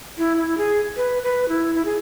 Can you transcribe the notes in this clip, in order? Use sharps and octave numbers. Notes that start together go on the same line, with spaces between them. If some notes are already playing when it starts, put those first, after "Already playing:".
E4
E4
G#4
B4
B4
E4
E4
G#4